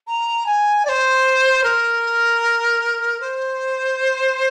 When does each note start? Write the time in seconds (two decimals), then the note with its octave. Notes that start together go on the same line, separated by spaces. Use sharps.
0.07 A#5
0.46 G#5
0.85 D5
0.89 C5
1.64 A#4
3.20 C5